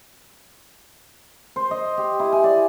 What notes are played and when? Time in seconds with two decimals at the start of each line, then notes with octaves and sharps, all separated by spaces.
1.56 C5
1.71 D#5
1.97 G4
2.20 E4
2.32 G#5
2.44 D5